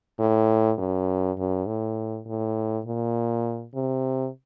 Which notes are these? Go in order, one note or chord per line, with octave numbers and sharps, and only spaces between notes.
A2
F#2
F#2
A2
A2
A#2
C3